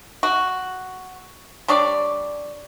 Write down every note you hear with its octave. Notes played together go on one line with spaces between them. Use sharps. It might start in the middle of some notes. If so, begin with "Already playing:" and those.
F#4
G3 D4 C#5 D5